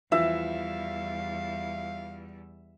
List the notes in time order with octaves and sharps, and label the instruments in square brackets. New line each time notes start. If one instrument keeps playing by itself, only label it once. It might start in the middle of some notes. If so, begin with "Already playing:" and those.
[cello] E2 G3 [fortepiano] E3 F3 [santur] E5 [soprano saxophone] F5